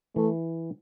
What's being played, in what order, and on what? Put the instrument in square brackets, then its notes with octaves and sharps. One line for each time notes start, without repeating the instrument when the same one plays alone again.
[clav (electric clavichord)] E3 [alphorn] A3